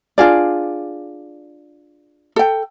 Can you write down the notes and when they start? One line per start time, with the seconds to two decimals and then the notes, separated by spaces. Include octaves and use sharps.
0.18 D4 F4 G#4 D5
2.36 A4 G5